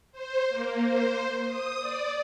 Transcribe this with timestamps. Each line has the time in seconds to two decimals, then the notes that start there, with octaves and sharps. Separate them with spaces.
0.12 C5
0.49 A#3
0.83 C5
1.45 D#6
1.79 D5